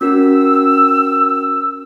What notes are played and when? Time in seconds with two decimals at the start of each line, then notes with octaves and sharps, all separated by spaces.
0.01 C#4 F#4 A#4 E6